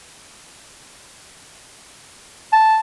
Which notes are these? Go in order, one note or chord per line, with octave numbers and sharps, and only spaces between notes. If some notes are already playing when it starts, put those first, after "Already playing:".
A5